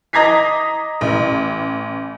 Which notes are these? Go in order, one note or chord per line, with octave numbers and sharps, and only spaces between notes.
D#5 A#5 D6 G#6 B6 C7
A1